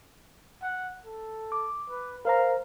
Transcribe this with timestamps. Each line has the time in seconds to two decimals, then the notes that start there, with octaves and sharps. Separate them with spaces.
0.62 F#5
1.06 A4
1.52 D6
1.90 B4
2.25 A#4 C5 F5 A#5